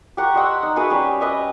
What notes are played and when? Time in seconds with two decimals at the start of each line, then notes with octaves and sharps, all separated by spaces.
0.17 G4 F#5 A#5 C#6
0.34 C5 D#5 F#5 E6
0.63 D#4
0.76 F#4 G#4 B4 E5
0.90 G3 C#4 G4 C#5
1.21 B4 D#5 E5